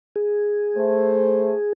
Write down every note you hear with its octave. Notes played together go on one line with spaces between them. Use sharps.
G#4
A3 C5